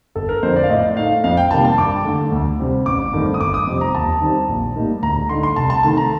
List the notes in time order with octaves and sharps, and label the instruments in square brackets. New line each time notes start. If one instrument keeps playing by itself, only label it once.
[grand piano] G1 A4
A#4
F2 D3 C5
D5
F5
A2 D#5
A3 D#4 F5
F2 F5
G5
C3 D#3 G3 A#3 A5
A5
G2 D6
D3 A3
D2
C3 G3 C4
A1 D6
G2 D#3 A3 C4
D#6
G1 D6
D#6
F2 C3 G3 C4
A#5
D#2 A5
D#3 G3 C4 D#4
A#1
A2 G3 A#3 D#4
D2 A#5
D3 A3 D#4 C6
C6
C2 A5
A5
C3 D#3 A3 D#4 A5
A#5